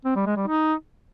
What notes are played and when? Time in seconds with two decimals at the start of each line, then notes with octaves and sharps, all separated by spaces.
0.05 C4
0.16 G3
0.26 G#3
0.37 G3
0.47 D#4